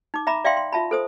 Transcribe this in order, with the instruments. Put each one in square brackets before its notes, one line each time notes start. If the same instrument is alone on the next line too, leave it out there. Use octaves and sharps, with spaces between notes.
[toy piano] D#4 D6
E5 A#5 B5 D6
D5 E5 F5 G5 C6
C6
F4 E5 A5 B5
A4 C5 D#6